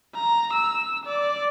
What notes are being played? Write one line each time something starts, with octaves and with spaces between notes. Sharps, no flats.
A#5
E6
D5